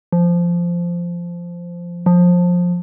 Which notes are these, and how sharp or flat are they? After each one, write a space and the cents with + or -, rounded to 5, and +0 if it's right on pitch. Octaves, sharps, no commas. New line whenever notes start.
F3 -10
F3 +20